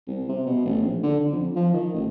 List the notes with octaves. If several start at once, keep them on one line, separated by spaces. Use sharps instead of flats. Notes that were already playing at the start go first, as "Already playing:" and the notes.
C2
C3
B2
A1
A#1
D3
D3
F2
F3
D#3
A1